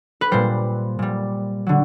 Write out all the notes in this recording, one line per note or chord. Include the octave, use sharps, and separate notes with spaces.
B4
A#2 G3 C5
A#2 G3
D3 F#3